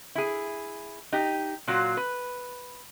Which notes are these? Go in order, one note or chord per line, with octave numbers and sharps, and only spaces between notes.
E4 G#4
D#4 G4
A#2 F#3 F4 F#4
B4